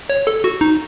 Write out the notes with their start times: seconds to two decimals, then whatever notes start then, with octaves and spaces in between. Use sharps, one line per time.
0.10 C#5
0.27 A4
0.44 F#4
0.61 D#4